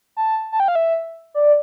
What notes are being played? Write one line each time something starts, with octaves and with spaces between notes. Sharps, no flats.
A5
A5
G5
F5
E5
D5